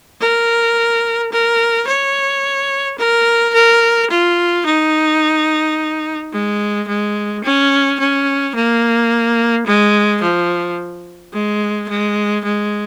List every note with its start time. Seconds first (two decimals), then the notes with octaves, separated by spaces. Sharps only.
0.21 A#4
1.32 A#4
1.88 C#5
2.98 A#4
3.54 A#4
4.10 F4
4.66 D#4
6.33 G#3
6.88 G#3
7.44 C#4
7.99 C#4
8.55 A#3
9.67 G#3
10.22 F3
11.33 G#3
11.89 G#3
12.45 G#3